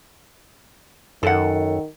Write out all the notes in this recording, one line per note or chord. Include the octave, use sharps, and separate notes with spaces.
F#2 D#3 A4 F#5